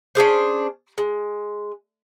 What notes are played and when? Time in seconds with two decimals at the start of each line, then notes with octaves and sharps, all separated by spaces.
0.15 C#4 D4 G#4 C5
0.98 G#3